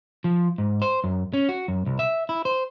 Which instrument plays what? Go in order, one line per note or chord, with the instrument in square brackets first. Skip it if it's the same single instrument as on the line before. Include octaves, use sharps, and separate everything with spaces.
[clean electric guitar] F3
G#2
C5
F#2
C#4
F#4
F#2
C2
E5
E4
C5